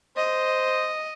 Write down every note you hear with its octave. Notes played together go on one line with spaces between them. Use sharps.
C5 D#5